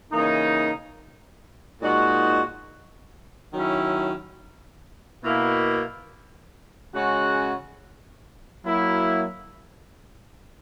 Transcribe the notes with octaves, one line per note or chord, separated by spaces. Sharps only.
C#3 E3 A#3 D#4
A#2 G#3 D#4 F#4
D#3 F#3 C#4 E4
B2 A#3 E4
C#3 G#3 C#4 F#4
F#3 A#3 E4